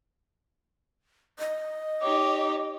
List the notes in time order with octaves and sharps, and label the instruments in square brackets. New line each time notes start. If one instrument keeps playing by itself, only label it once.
[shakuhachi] D#5
[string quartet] D#4 G4 C#5 [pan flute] D6